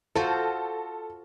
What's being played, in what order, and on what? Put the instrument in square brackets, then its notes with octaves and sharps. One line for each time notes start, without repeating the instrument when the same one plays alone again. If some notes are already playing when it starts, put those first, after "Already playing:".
[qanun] F4 F#4 C5 [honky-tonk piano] A4